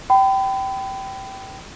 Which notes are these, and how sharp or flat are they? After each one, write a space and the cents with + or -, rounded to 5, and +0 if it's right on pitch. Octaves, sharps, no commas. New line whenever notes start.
G5 -20 B5 +35